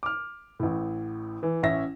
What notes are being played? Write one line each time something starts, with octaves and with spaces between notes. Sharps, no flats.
D6 F6
A1 A2
E3
A1 C#4 E5 A#6